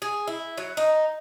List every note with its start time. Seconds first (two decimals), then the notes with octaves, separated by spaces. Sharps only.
0.02 G#4
0.27 E4
0.57 F#3
0.77 D#4